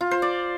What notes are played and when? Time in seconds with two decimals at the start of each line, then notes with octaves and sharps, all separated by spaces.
0.01 F4
0.11 C5
0.22 D5